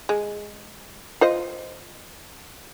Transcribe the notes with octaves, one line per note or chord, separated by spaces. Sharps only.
G#3
F4 C5 D#5